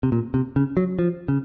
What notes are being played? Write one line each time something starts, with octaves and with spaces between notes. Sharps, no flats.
C3
A#2
C3
C#3
F#3
F3
C#3